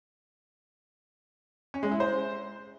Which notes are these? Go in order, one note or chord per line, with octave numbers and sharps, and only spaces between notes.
C#4
G#3
E4
C5